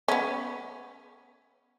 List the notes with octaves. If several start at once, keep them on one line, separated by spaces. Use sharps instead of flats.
B3 C#4